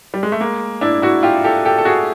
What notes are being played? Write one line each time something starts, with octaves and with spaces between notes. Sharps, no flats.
G3
G#3
A3
G#3 A#3
D4 E4
E4 F#4
F4 G4
G4 A4
G4 A4
A4
F#4 G#4